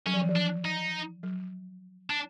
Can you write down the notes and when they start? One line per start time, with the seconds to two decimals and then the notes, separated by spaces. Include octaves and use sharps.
0.06 F#3 C#4
0.14 F3
0.21 E3
0.29 F3
0.36 D4
0.65 D#4
1.23 F#3
2.10 D4